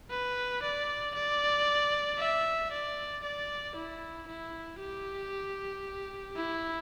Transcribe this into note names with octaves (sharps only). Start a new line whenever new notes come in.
B4
D5
D5
E5
D5
D5
E4
E4
G4
E4